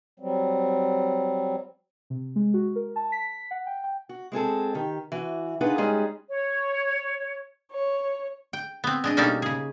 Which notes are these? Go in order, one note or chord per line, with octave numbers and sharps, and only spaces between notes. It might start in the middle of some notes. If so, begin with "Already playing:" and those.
F#3 G3 C4
C3
G#3
F#4
A#4
A5
B6
F#5
G5
G5
F#4
G#3 C4 G#4 A4
D#3 G4
E3 F#4
D4 D#4 F4 G#4 B4 F#5
G3 G#3 C#4 D#4 G#4
C#5
C#5
G5
B3 C4
G#3 D4 D#5
B2 G3 A#3 C#4 D#4 A4
C#3 G#4